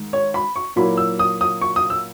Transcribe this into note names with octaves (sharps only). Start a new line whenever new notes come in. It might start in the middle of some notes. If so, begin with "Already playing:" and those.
Already playing: G#2 D#3
C#5
B5
C#6
A#2 F#3 A#3 E4 B5
E6
D#6
D#6
C#6
D#6
E6